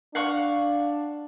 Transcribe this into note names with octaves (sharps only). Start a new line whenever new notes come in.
D4 F5 F#5 C#6